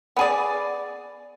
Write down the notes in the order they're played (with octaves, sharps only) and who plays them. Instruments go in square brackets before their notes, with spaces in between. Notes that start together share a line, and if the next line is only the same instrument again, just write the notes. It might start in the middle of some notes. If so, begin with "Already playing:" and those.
[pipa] B3 G#4 D5